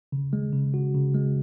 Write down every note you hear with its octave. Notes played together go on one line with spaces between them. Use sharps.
C#3
G#3
C#3
F#4
C#3
G#3